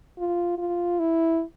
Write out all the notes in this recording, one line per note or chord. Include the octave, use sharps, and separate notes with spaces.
F4
F4
E4